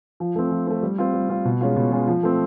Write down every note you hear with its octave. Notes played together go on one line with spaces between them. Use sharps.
F3
A3 C4
F3
A3 C4
G3
C4 F4
G3
C4 F4
B2
G#3 C#4 F4
B2
G#3 C#4 F4
F3
A3 C4